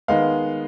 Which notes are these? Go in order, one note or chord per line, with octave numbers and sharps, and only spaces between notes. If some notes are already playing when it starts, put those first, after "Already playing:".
D#3 G#3 B3 F5